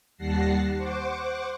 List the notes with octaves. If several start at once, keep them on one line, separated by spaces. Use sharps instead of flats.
D#2 G3 F#5 A5 A#6 C7
C5 F#5 C#6 D6